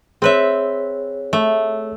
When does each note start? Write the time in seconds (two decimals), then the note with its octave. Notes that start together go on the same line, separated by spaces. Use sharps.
0.22 C4 G#4 B4 C#5 E5
1.33 A3